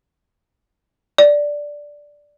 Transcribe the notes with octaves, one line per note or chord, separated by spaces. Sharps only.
D5